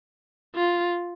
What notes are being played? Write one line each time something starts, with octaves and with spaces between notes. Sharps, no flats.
F4